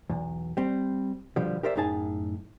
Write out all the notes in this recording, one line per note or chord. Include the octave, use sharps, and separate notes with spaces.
B1 E2
G3 C4
B2 D3 F3 G3
G4 A#4 C5 D5 E5
F#2 A2 D#4 G#4 A5